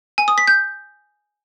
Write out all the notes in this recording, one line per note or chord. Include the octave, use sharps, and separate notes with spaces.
G#5
D#6
B6
G6